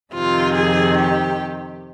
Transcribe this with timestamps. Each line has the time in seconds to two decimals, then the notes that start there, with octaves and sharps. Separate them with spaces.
0.14 F2 C3 D#3 F4
0.56 G#4
0.98 G4